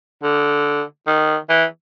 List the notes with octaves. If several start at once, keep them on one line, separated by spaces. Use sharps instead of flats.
D3
D#3
E3